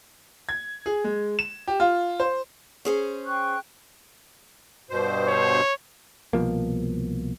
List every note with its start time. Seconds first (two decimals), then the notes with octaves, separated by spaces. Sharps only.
0.49 G#6
0.86 G#4
1.04 G#3
1.39 E7
1.68 G4
1.80 F4
2.20 C5
2.85 C#4 G#4 C5
3.25 G5 C#6 F#6
4.90 G2 B2 C5
5.28 C#5
6.33 C2 B2 F3 A#3